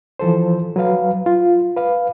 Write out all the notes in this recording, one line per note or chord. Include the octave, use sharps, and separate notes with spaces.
E3 F3 A4 C5
F#3 B4 F5
F4
B4 F5